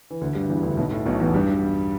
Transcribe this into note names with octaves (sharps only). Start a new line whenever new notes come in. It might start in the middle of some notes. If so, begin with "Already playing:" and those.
E3
D2 D3
G2 G3
E2 E3
D2 D3
B1 B2
A2
B1 B2
E2 E3
G2 G3